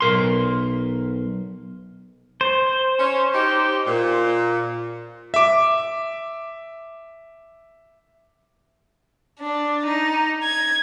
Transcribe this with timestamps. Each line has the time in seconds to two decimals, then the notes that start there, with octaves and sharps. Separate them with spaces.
0.01 B1 A#4 C6
2.41 C5
2.99 C#4
3.34 D#4 G4
3.87 A#2
5.34 E5 D6
9.39 D4
9.86 D#4
10.43 G#6